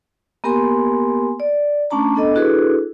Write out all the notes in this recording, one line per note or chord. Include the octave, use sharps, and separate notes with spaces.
A#3 B3 G4 A#4 G#5 C6
D5
A3 C#4 D4 A5 A#5
B3 D4 A4 D#5
D4 E4 F#4 G#4 A4 B4